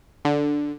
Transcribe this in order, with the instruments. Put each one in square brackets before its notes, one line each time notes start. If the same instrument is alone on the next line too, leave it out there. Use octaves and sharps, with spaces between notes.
[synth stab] D3